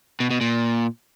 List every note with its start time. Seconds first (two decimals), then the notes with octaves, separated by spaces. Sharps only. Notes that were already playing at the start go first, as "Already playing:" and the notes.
0.20 B2
0.31 B2
0.41 A#2